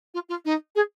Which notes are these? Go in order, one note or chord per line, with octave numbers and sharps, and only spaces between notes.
F4
F4
D#4
G#4